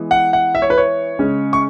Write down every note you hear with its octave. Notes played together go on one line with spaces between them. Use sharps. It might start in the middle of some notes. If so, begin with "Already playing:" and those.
Already playing: E3 G#3 B3
F#5
F#5
E5
C#5
B4
C#5
C#3 G#3 C#4
C#6